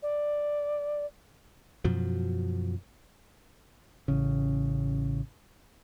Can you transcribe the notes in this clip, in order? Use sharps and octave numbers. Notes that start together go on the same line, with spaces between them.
D5
F#2 B2 F3 F#3
A1 C#3